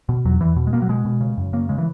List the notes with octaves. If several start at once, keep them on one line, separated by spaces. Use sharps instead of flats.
B2
E2 F#3
E2 E3
B2
G#3
B2 A#3
F#3
B2 G#3
B2
C#3
F#2
C#3 A#3
C#3 G#3
E3